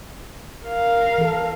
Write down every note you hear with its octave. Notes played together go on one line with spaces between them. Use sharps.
A#4 F5
E3 A4